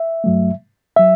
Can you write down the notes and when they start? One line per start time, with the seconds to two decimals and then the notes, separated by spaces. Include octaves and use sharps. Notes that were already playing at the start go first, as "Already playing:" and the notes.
Already playing: E5
0.24 G2 F#3 A3
0.96 F#3 E5